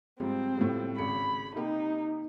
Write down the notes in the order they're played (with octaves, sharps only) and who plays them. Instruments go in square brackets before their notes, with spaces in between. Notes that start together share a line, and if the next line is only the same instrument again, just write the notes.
[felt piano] G#2 F3 G3 [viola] C4
[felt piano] A2 F3 G3
[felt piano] G#1 C#3 C#7 [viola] B5
[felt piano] C3 A#3 G4 [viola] D#4